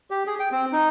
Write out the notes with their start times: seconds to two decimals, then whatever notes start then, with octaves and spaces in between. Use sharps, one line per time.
0.11 G4
0.27 G#4
0.39 G5
0.52 C4
0.73 D#4